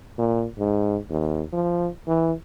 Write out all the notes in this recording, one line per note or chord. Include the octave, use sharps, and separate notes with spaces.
A#2
G#2
D#2
F3
E3